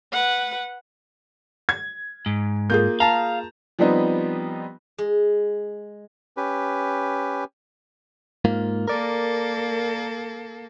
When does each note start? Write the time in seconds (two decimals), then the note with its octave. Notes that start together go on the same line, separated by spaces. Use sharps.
0.12 B4 F#5
1.69 G#6
2.26 G#2
2.70 A#3 F4 G#4 G6
3.00 F5 A5 A#5
3.79 F3 G3 B3 C4 D#4
4.98 G#3
6.37 C#4 G4 B4
8.45 G#2 A#3 F4
8.88 A#3 A4 A#4 D5